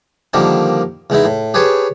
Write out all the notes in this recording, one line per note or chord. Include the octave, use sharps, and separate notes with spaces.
D3 D#3 F3 G3 A#3 D#4
E2 G#3 D#4 E4
A2
G4 G#4 B4 C#5 A5